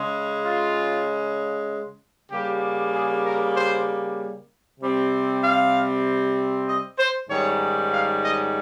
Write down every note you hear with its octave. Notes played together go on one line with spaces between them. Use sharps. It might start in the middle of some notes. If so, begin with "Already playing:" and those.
Already playing: C#3 G#3 C#4
F4
C#3 G3 A#3 G4
G#4
A#4
C5
C3 G3 C4
F5
D#5
C5
G#2 D#3 G3 C#4 C#5
F5
D#5